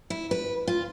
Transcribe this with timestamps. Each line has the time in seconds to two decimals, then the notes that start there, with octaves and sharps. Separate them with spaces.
0.10 E4
0.31 B4
0.68 F4